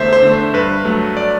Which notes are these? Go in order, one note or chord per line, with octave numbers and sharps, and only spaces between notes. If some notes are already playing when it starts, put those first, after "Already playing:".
Already playing: E2 D3 A3 C5 E5
C5
D3 A3
C5
G2 B4
F#3 A3
D5